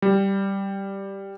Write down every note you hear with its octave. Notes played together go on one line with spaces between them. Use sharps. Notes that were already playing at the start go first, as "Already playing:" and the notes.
G3